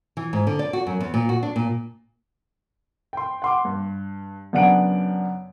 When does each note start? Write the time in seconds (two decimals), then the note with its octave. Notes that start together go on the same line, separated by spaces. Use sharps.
0.17 E3
0.33 G#2
0.47 D3
0.59 D5
0.73 F#4
0.87 F#2
1.00 E2
1.14 A#2
1.29 F#4
1.43 D4
1.56 A#2
3.13 G5 C6
3.42 F#5 C6 D6
3.65 G2
4.53 F#2 C#3 B3 D4 F#5 D7